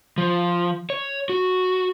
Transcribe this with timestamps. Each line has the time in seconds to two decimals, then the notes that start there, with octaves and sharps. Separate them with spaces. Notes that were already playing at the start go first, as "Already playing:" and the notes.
0.18 F3
0.90 C#5
1.29 F#4